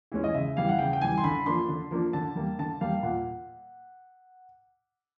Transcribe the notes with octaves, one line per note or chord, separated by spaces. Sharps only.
E3 G#3 C#4
D#5
C#3 E5
E3 G3 F5
F#5
C#3 G5
G5
E3 G3 G#5
C6
D3 B5
F3 A#3 D4 C6
D3
F3 A#3 D4
D3 A5
G3 A#3
D3 A5
G3 A#3 F5
A#2 F#5